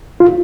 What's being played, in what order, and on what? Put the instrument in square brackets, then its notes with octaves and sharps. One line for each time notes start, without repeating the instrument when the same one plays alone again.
[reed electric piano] F4